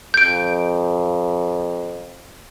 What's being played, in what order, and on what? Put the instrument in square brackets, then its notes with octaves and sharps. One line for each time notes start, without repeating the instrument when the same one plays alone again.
[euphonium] F2 [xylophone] G6 D7